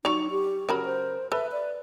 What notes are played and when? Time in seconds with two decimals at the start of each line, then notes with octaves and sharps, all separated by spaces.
0.05 F#3 D#4 D5 C#6 F7
0.31 G4
0.69 C#3 F#3 A#4 B5
0.85 C5
1.32 A4 B4 E5
1.52 D5